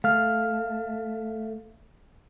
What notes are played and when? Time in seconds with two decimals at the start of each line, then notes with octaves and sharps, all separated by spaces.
0.04 A3 F5 F6